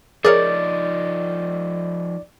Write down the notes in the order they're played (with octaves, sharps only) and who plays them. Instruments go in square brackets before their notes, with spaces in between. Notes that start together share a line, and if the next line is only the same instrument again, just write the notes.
[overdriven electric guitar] F3 D#4 [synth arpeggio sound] G#4 A#4 C#5 [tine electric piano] D5